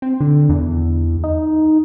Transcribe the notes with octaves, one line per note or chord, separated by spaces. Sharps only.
C4
D3
E2
D#4